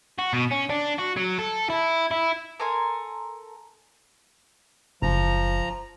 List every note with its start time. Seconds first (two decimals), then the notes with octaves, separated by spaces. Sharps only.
0.19 F#4
0.33 B2
0.51 C#4
0.69 D4
0.98 F#4
1.17 F#3
1.38 A4
1.70 E4
2.11 E4
2.60 A4 A#4 G#5 C6
5.02 F#1 F3 A#5